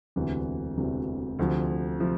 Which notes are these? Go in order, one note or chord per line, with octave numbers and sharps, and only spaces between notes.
E1 D2 C3 E3
E1 D2 C3 E3
D2 C3 F3
C3 F3